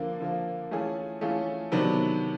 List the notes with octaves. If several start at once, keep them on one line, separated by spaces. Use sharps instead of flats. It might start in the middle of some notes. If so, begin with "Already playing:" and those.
Already playing: D3 F3 A#3
D3 F3 A#3
E3 A3 C#4 F4 G#4
E3 A3 C#4 F4 G#4
C3 D#3 F#3 B3 D4